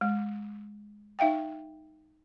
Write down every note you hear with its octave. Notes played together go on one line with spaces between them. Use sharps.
G#3
D#4 E5 F5 G5